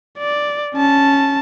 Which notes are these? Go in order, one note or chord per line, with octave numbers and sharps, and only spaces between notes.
D5
C#4 A5